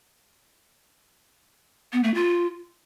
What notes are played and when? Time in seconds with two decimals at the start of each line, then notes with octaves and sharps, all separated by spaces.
1.93 B3
2.04 A3
2.14 F4